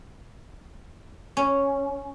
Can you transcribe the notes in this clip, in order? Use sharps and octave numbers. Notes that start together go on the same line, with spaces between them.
C#4